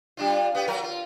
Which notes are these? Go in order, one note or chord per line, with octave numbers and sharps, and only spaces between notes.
G3 D4 F4
B3 G4
F3 F#3 A#4
F4